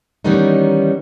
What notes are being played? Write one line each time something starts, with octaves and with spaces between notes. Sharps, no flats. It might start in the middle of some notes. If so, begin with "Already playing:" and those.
D#3 E3 G3 B3 C#4 D#4